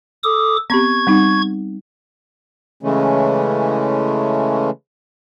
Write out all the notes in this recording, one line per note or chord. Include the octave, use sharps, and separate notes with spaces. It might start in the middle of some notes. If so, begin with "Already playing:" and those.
A4 D6 D#6
B3 C4 G4 C#6 G#6
G3 C4 D#4
C#3 E3 G#3 A3 C#4